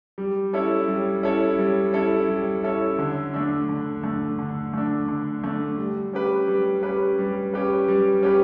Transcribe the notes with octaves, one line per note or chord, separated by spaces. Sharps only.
G3
C#4 E4 A4 C#5
G3
C#4 E4 A4 C#5
G3
C#4 E4 A4 C#5
G3
C#4 E4 A4 C#5
D3
A3 D4
D3
A3 D4
D3
A3 D4
D3
A3 D4
G3
C#4 G4 B4
G3
C#4 G4 B4
G3
C#4 G4 B4
G3
C#4 G4 B4